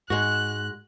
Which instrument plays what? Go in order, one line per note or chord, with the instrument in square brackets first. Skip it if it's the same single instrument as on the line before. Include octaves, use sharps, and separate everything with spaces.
[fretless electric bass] G#2 [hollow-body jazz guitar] G#3 F#4 [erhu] F#6